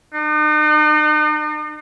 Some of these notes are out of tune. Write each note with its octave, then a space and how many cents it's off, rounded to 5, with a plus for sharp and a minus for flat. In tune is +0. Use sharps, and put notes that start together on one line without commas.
D#4 -45